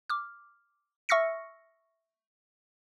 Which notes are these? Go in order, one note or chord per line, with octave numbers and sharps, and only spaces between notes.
D6 F6
E5 C#6 E6 F6 A#6 C#7